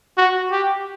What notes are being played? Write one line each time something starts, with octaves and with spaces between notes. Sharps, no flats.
F#4
G4